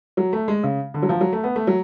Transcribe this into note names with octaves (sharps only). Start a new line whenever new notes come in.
F#3
A3
G#3
C#3
D3
F#3
F3
F#3
A3
B3
A3
F#3